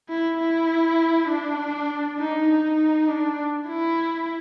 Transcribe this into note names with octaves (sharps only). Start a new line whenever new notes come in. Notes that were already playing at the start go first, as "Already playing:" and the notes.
E4
E4
D4
D#4
D#4
D4
E4